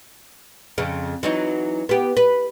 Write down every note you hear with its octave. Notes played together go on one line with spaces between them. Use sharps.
F2 C#3
E3 F#3 D#4
B3 G4
B4